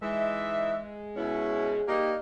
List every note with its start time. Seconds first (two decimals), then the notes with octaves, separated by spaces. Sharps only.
0.02 E3 G#3 D#4 E5
1.17 B2 C#4 E4
1.88 G3 A#3 D#4